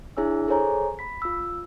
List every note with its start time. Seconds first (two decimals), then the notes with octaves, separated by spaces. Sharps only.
0.17 D4 E4 G#4 C#5 G#5 E6
0.48 G#4 A4 C5 C#5 G#5 A#5
0.99 B5 B6
1.22 F4 E6